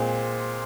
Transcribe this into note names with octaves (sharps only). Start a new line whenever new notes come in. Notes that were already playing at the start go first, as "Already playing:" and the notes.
Already playing: A#2 G#3 C4